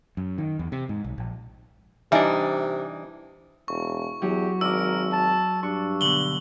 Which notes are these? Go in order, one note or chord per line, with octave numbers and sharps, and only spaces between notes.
F#2
D#3
E2
C3
G#2
B1
A#1
C3 E3 G3 D4 D#4 E5 G#5
E1 C#6
E2 F#3 G4
G#1 A#4 D5 D6 E6
A5
G2 D4 C#6
B2 D3 F#7 G7